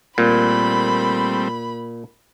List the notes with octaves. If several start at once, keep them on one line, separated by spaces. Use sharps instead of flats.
A#2 G3 A3 C4 B5